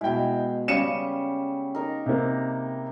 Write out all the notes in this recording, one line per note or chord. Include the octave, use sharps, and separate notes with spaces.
B2 G#3 E4 G5
C#3 G3 C#7 D#7 E7
D#4 A#4
C3 A#3